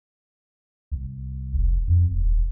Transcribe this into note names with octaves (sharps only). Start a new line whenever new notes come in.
C2
F1
F2
D#1